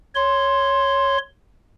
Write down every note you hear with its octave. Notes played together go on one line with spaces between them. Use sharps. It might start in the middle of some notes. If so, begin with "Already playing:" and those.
C#5 C6